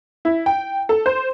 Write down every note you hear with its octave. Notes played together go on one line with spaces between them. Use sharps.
E4
G5
A4
C5